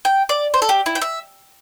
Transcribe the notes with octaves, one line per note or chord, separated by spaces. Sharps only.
G5
D5
C5
A4
G4
E4
G5
E5